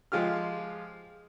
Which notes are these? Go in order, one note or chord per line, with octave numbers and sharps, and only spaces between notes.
F3 G#3 F4 G4 F6